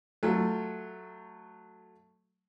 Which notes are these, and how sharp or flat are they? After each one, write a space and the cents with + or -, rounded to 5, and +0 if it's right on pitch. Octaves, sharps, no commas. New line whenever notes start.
F#3 +0 A3 +5 F4 +0